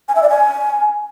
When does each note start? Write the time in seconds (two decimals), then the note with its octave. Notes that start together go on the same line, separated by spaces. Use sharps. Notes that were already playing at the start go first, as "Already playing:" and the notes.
0.08 G#5
0.15 E5
0.22 D5
0.29 G#5